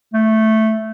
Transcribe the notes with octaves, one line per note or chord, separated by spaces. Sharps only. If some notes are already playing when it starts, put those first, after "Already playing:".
A3